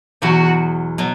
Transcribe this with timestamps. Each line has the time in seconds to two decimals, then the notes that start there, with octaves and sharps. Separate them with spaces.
0.22 E2 B2 F#3 F#4
0.98 B2 F#3